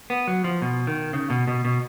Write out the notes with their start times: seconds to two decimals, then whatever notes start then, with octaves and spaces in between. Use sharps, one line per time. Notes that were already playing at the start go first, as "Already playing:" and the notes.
0.10 B3
0.27 F#3
0.44 F3
0.62 B2
0.87 D#3
1.13 C#3
1.30 B2
1.48 B2
1.65 B2